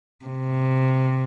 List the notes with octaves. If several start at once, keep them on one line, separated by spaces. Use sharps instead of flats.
C3